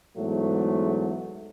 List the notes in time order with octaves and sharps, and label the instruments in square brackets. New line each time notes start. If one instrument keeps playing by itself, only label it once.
[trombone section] E2 G#2 F#3 A3